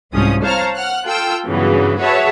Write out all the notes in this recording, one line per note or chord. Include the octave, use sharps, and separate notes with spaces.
C2 G#2 F3 C#4 D#6
C5 C#5 F5 A5 A#5 F6
F#5 F6 F#6
F4 A4 G5 E6
G2 C#3 E3 F#3 B3
F#4 G#4 B4 C#5 E5 A5